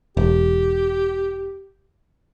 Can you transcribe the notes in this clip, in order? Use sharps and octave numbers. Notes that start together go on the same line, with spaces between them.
E1 G4